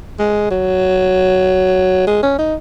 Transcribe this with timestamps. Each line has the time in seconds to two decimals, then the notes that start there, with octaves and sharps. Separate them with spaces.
0.19 G#3
0.50 F#3
2.07 G#3
2.22 C#4
2.39 D#4